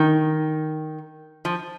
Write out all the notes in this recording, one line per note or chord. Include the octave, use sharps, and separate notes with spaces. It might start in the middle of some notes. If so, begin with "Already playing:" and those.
Already playing: D#3
F3